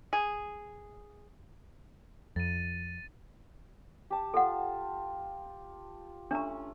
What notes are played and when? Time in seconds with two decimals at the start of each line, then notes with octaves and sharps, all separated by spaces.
0.13 G#4
2.36 F2 A6 D#7
4.10 G4 A5
4.34 F4 A4 F#5
6.31 A3 C#4 D4 A#5